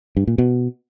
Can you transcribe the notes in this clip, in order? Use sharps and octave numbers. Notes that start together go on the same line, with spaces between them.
G2
A#2
B2